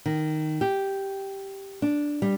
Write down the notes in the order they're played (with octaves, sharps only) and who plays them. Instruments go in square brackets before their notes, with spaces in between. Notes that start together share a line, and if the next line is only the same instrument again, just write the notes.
[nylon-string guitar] D#3
G4
D4
G3